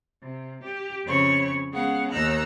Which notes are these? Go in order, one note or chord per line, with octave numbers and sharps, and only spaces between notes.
C3
G4
F2 C#3 C4 C#5 B5 C#6
G#3 B3 C#4 G#4 F5 F#5
D#2 D#4 A#5 E6 F#6